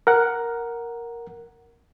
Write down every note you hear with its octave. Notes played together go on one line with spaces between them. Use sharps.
A#4 F#5